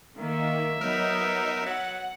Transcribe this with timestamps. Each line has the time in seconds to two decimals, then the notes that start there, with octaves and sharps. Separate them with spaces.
0.18 D#3 A#3 E5
0.81 F#3 B3 D#4 A#4
1.66 F#3 F#5